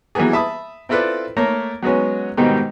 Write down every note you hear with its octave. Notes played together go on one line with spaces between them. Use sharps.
E3 F#3 G3 A#3 B3 G#4
E5 A5 B5 D#6
C4 E4 F4 A4 B4 D5
A3 A#3 A#4 C#5
F#3 G#3 B3 C#4
G#2 B2 D#3 G3 C4 D#4